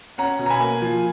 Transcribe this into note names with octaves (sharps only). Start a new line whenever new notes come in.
C#4 F#5 A#5
B2
A#5
G#5 B5
A#3
F3